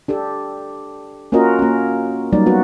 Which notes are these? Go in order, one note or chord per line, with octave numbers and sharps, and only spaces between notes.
D4 G4 A4
A#3 C#4 F4 F#4 A#4 D#5
A#3 C#4
F#3 G3 A#3 D#4 D5
B3 F#4 B4